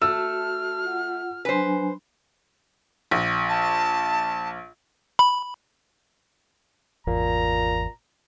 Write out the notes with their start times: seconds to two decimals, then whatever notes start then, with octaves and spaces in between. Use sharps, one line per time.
0.02 A3 F#4 A5 E6 F6
0.84 F4 F#5
1.45 F#3 D4 B4 C5 G#5
3.11 A#1
3.49 A5
5.19 B5
7.07 G#1 E2 A#2 A#5